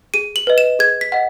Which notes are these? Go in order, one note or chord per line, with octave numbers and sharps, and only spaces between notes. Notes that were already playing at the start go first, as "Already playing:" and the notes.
G#4 D#7
F#7
B4 D#5
E7
G#4 G#6
B6
D#5 F#5